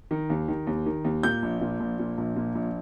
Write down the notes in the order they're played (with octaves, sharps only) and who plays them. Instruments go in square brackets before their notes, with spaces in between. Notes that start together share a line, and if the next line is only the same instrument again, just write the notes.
[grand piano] D#3
D#2
D#3
D#2
D#3
D#2
A#2 G6
A#1
A#2
A#1
A#2
A#1
A#2
A#1